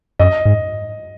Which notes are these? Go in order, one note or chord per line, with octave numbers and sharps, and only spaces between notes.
F#2 D#5
G#2